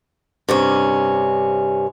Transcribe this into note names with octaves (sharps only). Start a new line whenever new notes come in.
G2 C3 C#4